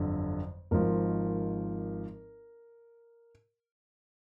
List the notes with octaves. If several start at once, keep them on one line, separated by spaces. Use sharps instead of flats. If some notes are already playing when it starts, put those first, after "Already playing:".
Already playing: G1 F2 D3 F#3
G#1 G#2 F3 A#4